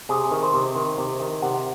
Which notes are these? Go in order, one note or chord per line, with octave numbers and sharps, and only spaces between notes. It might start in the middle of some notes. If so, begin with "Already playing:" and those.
C3 G#4
D#3
C5
C3
D#3
C3
D#3
C3 F#5